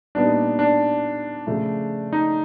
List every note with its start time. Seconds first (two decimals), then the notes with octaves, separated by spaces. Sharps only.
0.15 A#2 G3 B3 D4 D#4
0.59 D4
1.47 C#3 F3 A3
2.13 D#4